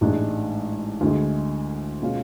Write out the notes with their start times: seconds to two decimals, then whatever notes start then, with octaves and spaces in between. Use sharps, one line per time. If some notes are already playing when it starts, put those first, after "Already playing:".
0.01 A1 G#2 G#3 D4
1.01 D2 D3 G#3
2.02 B2 G#3 C#4 F4